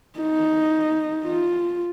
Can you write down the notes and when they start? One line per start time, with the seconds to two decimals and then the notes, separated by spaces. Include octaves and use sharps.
0.19 D#4
1.25 F4